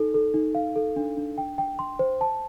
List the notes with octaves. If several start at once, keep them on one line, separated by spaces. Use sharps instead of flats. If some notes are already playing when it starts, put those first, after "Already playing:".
Already playing: D#4 A4
A4
D#4
F5
A4
D4
D4
G5
G5
C6
C5
A5